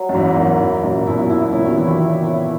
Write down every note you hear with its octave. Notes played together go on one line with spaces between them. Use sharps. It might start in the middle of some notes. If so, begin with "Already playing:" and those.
Already playing: F#3
F#2
E2 G#2 E4
E2 G#2 A#4
E4
F#2 A#2 A#4
G#2 B2 E4
E4
A#2 C#3 E4
B2 D#3
C#3 E3 E4
D#3 F#3
E4
E4